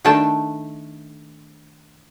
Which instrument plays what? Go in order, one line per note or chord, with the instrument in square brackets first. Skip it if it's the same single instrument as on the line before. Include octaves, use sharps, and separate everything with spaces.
[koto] D#3 A3 D4 G5 A5